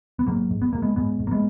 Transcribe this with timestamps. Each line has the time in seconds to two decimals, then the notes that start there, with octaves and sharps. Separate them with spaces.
0.19 B3
0.27 G#2 F#3 A#3
0.51 G#2
0.62 B3
0.73 G#2 A#3
0.82 G#3 B3
0.96 G#2 G#3 B3
1.20 G#2
1.27 A#3
1.31 G#3 B3